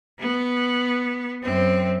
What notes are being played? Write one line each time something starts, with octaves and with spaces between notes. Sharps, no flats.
B3
F#2 C4